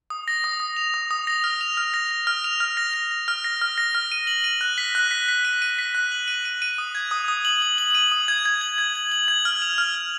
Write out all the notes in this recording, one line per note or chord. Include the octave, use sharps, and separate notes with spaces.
D#6
A#6
D#6
D#6
F7
D#6
D#6
A#6
F6
F7
F6
A#6
A#6
F6
F7
F6
A#6
A#6
A#6
F6
A#6
F6
A#6
F6
D#7
F#7
D#7
F#6
B6
F#6
B6
B6
D#7
D#7
B6
F#6
F#7
D#7
D#7
D#7
D#6
G#6
D#6
D#6
F#7
F#7
F#7
D#7
D#6
G#6
G#6
F#7
G#6
F#7
F#7
G#6
F6
F7
F6
F6